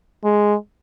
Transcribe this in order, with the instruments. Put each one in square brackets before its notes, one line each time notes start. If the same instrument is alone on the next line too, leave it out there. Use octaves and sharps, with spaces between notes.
[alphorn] G#3